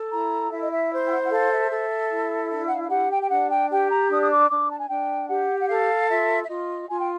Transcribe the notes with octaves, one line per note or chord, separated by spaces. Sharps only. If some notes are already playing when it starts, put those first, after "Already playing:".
Already playing: A4
E4 A#5
E4 E5
D#5
E5
C5
G5
F#5
F#5
A4 F5
E5
A4
E4
D4 E5
F#5
F5
F5
G4 F#5
G5
G5
D4 F#5
G5
G4 G5
A#5
D4 D#6
D#6
D6
D4 D6
A5
G#5
D4 G5
G4 F#5
F#5
A4 F5
F4 E5
E5
F4 D#5
F4 G#5
G5